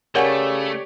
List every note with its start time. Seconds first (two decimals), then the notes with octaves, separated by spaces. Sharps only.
0.15 C#3 A3 G4 A#4 C#5 D5 F#5 G#5